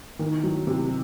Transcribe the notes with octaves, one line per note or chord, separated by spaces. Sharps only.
D#3
F#3
C3